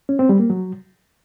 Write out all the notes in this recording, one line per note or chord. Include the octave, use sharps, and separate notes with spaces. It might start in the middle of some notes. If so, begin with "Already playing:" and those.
C#4
C4
G3
A#3
F#3